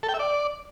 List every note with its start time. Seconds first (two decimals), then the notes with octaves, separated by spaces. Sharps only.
0.03 A4
0.09 G5
0.14 E5
0.19 D5